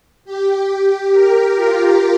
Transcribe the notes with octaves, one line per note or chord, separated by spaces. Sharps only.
G4
G4
A#4
F4